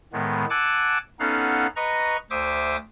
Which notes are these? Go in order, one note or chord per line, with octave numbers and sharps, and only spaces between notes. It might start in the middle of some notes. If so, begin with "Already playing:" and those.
A2 D#3 G#3 B3
F#5 G#5 A5 D6 E6 F#6
B3 C#4 D#4 A4 F5 F#5
B4 D#5 A#5 C#6
D2 C5 E5 D6 D#6